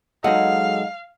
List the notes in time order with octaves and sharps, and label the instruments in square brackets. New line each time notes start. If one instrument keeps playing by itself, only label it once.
[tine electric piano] F#3 G#3 A4 [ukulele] D#4 F#5 [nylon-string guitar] G#4 D#5 [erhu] F5